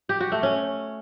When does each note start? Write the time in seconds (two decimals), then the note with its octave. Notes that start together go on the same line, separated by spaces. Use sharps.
0.09 G4
0.20 F#4
0.32 A3
0.43 C#4